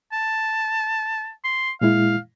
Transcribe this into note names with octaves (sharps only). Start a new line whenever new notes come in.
A5
C6
A#2 G#3 E4 F5